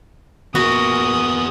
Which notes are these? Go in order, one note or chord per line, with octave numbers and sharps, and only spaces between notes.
A#2 B3 F#4 G#4 A#4 D#6